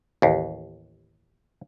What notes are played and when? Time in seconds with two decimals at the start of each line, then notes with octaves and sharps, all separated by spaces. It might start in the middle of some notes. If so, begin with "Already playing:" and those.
0.22 A1 D#2